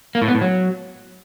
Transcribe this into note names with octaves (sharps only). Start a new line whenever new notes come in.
A#3
A2
B3
A2
F#3